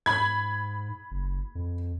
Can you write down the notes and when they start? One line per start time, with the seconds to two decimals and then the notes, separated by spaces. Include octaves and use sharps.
0.06 G#2 B5 G#6
1.11 F#1
1.55 F2